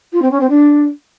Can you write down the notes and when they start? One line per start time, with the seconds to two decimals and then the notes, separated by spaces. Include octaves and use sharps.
0.12 F4
0.21 C4
0.31 C#4
0.40 C4
0.49 D4